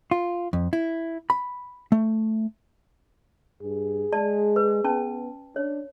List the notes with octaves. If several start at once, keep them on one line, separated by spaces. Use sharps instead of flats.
F4
F2
E4
B5
A3
G2 G#4
G#3 D5 A5
B4
B3 C#4 A5
D4 C#5